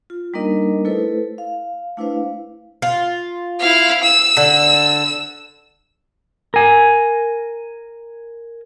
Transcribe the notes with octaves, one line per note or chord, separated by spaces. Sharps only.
F4
G3 A#3 D4 D#4 A#4 D#5
A3 E4 A4 B4 C5
F5
A3 D4 E4 B4 C5 F5
F4
E4 F5
E6
D3
A#4 G#5